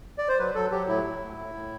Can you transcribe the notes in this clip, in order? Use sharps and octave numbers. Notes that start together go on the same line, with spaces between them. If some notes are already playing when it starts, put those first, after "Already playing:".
D5
C5
F#3 B4
F#3 A4
F#3 G4
A2 E4
A2
A2
A2
A2